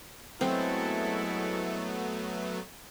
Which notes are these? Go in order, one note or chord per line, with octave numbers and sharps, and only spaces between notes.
F#3 G#3 A3 B3 C4 E4 A4